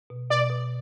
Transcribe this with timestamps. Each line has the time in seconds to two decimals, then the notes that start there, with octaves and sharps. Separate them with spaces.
0.10 B2
0.30 B2 D5
0.50 B2